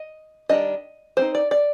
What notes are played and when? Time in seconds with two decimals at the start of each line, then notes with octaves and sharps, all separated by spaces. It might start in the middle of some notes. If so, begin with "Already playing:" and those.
Already playing: D#5
0.49 D#3 G3 D4 D#5
1.17 G3 C4 D#4 C5
1.35 D5
1.51 D5